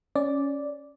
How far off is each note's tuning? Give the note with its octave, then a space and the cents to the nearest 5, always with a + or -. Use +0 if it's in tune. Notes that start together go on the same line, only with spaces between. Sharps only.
C#4 +0 D5 -5